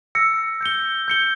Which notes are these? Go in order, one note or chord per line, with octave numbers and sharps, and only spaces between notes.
E6 A#6 C#7
G6 C#7 G7
G6 C#7 G7